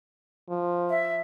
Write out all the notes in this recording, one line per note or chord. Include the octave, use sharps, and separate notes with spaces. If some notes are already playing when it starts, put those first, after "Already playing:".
F3
E5